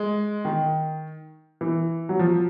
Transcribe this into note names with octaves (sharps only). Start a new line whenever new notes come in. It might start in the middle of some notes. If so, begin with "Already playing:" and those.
Already playing: G#3
D#3
E3
F#3
F3